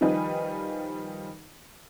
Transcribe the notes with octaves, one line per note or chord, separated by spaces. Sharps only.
D#3 F3 G3 D#4 B4 G#5